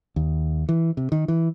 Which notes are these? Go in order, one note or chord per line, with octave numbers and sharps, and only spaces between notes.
D#2
E3
C3
D#3
E3